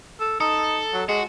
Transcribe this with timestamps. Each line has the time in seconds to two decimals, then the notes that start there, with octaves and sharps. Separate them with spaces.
0.20 A4
0.41 D#4 A4
0.93 F#3
1.09 G#3 F#4